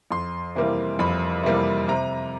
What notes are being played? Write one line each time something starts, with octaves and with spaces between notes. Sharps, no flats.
F2 C6
C3 E3 G3 A#3
F2 B5
C3 E3 G3 A#3
C3 A#5